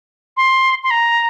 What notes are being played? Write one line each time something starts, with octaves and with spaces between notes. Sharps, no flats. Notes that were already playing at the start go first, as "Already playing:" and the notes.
C6
C6
A#5